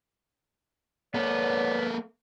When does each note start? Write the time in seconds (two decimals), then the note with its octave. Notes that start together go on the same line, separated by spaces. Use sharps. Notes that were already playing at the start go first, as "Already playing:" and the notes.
1.15 A#3 B3 A4 C#5 D5